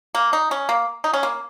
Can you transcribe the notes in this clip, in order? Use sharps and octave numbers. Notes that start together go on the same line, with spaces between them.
A#3
D#4
C#4
A#3
D#4
C#4
A#3